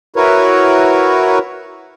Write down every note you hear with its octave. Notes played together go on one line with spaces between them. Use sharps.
E4 F#4 A#4 B4 C#5